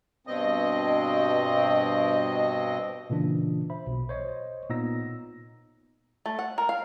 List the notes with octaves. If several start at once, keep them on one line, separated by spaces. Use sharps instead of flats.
G2 B2 C4 D#5
A#2 C#3 E3 D4
C5 E5 B5
B1 B2
C5 C#5 D#5
A#2 B3 D#4 E6 A#6
A3
F#5
A#4
F5